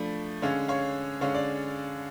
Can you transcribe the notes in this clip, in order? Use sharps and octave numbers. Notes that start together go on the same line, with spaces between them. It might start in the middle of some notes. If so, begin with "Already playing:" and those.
Already playing: F3 A3 D4 B5
D3 G#3 C#4 C#5 F5
C#5 F5
D3 G#3 C#4 C#5 F5
D5